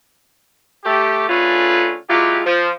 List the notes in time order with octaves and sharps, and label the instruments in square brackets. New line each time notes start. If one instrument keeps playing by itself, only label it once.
[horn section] A3 G4
D3 A3 C#4 F4 G#4 B4
F#3 G#3 E4 F4 G4
F3